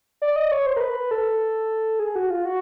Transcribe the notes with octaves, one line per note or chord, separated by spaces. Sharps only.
D5
D#5
C#5
C5
A#4
B4
A4
G#4
F#4
F4
F#4